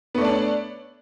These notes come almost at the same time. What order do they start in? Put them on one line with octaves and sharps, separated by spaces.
B3 A3 D5 D4 C#5